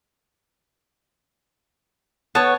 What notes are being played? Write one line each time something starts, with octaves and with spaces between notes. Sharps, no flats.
B3 C#5 A5